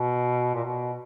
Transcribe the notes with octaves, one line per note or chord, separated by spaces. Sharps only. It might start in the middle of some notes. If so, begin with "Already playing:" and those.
Already playing: B2
A#2
B2